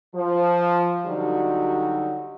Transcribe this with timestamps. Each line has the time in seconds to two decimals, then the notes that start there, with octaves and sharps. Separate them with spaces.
0.15 F3
1.06 D3 F#3 G3 D#4 F#4 G4